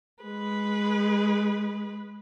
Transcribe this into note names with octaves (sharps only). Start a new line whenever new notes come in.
G#3 B4